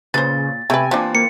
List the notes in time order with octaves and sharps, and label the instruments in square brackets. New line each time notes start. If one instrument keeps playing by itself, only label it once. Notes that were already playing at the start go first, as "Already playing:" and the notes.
[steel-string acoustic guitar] A#2 [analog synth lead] C#3 [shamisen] B4 C5 [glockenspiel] A6
[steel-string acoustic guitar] C3 [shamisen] A3 B4 [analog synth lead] G#5
[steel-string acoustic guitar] A#2 E3 C4 [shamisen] F3 D4
[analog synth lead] A#3 [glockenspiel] C#7